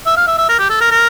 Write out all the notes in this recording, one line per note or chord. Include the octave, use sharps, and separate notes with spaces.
E5
F5
E5
E5
A#4
G4
A4
A#4
A#4